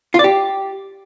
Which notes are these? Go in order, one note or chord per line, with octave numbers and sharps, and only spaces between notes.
F4
D5
G4